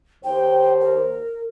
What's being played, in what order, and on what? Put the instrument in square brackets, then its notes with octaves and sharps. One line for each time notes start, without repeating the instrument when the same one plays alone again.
[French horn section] D#2 C5 [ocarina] G5
[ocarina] A#4